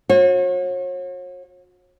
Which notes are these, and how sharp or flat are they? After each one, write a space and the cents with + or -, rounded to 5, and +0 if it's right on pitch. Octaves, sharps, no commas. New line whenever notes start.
F#4 -40 C#5 -40